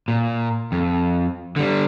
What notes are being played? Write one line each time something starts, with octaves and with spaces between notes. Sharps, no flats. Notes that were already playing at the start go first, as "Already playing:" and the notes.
A#2
F2
D3 G3